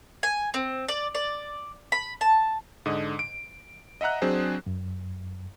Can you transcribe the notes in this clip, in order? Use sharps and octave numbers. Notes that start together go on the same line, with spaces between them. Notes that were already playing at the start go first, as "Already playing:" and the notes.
G#5
C4
D5
D5
B5
A5
G#2 D3 D#5 D#6
D7
D#5 E5 F#5 A#5 F#6
F#3 C4 D4 G#4 C5
F#2